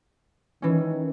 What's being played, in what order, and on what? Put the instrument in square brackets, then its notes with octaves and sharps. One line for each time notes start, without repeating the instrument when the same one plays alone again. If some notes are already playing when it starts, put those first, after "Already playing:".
[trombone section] D#3 [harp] E3 C#4